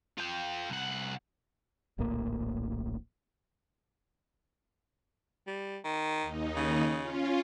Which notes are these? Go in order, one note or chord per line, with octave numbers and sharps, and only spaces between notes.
F4 G5
C2 F#5
D1 A#1 A2 A#3
G3
D#3
D#2 D#4
C#3
C#4 F4